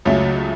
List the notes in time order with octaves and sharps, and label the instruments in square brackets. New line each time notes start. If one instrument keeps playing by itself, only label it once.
[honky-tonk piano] C#2 C#3 F#3 A3 C#4